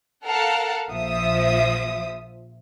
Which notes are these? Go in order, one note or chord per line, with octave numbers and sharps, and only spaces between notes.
A4 A#4 F5 F#5 A5
A#1 F3 E5 D#6